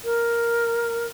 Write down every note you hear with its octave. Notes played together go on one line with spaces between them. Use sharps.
A#4